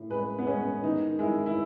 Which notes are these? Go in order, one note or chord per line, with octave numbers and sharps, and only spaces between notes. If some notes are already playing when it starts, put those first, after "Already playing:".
Already playing: A2
G#3 B4
B3
G#3 C#4
D#3 D#4
G#3 E4
E4